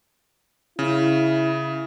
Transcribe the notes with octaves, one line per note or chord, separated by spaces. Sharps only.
C#3 E4